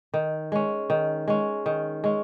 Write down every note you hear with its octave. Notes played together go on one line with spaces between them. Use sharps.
D#3
G#3 C#4
D#3
G#3 C#4
D#3
G#3 C#4